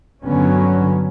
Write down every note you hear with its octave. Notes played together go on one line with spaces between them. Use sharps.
G2 D3 F#3 B3 C#4